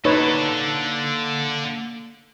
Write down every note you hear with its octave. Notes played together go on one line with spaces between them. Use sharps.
D3 A#3 D#4 A4 B4 C#5 C6